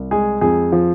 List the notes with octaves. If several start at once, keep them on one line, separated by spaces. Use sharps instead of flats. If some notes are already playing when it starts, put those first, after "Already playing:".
Already playing: C2
G#3 G#4
F2 G#4
F3